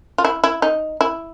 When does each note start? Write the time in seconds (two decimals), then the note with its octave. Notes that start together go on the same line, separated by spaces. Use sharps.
0.18 F4
0.25 E4
0.44 E4
0.62 D#4
1.01 E4